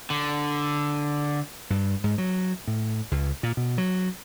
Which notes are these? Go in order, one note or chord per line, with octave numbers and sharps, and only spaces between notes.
D3
G2
G#2
F#3
A2
C#2
A#2
B2
F#3